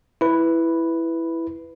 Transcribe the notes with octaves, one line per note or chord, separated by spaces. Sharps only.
E4 B4